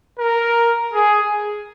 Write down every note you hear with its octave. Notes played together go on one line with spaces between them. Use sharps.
A#4
G#4